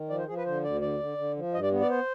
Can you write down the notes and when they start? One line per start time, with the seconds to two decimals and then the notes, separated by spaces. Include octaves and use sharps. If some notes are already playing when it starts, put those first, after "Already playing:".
Already playing: D#3
0.09 F3 D5
0.18 C5
0.28 F3 G#4
0.37 B4
0.45 D3 C5
0.64 D2 D5
0.82 D3 D5
1.00 D3
1.18 D3
1.36 F3
1.54 G2 D#5
1.63 D5
1.72 B3
1.81 D5
1.90 C5